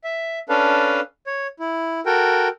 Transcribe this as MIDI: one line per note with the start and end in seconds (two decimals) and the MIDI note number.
0.04 0.39 76
0.49 1.01 61
0.49 1.01 62
0.49 1.01 69
0.49 1.01 71
0.49 1.01 77
1.27 1.47 73
1.60 2.00 64
2.06 2.48 66
2.06 2.48 69
2.06 2.48 70
2.06 2.48 79